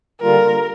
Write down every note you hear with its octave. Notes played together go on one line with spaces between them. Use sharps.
D3 G3 A#3 F4 A#4